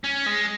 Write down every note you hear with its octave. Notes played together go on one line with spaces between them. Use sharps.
C#4
G#3